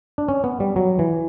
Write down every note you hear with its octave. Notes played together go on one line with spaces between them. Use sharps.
D4
C#4
B3
G3
F#3
E3